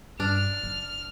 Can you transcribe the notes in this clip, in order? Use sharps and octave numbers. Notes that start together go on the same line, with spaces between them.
G2 D4 F6
F#1